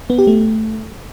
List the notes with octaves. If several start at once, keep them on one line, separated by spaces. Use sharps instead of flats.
B3
G4
A3